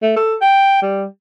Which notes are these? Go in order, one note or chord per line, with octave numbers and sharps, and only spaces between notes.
A3
A4
G5
G3